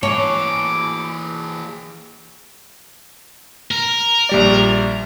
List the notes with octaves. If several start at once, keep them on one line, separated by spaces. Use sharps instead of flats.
E3 A#3 G#4 A4 C#5 D6
A#4
A#1 G3 D5